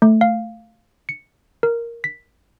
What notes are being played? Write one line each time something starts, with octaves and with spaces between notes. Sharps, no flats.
A3
F5
C#7
A#4
B6